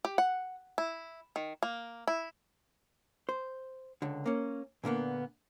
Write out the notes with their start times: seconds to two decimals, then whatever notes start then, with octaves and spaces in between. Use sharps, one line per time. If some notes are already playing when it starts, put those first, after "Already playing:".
0.05 G4
0.18 F#5
0.78 E4
1.36 D#3
1.63 A#3
2.07 E4
3.29 C5
4.02 C#2 D3
4.26 A#3 C#4
4.84 A#2 D3 A#3 B3